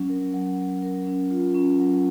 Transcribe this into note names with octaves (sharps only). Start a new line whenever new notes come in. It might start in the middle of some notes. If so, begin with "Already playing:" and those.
Already playing: F#3 C#4
A#4
F#3
F#3
A#4
C#4
F4
C#4
F#3